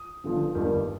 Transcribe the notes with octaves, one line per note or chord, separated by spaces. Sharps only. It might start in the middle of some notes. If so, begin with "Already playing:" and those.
Already playing: D#6
G1 G2 D3 F3
G1 G2 D#3 G3 A#3